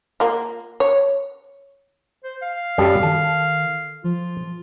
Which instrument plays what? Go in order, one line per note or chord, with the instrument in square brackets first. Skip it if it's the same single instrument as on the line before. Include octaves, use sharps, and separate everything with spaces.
[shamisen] A#3 F4
C#5
[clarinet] C5
F5
[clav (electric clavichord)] F#2 G3 A4
[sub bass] D#3 [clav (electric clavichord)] A4
[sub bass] F3 [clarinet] F4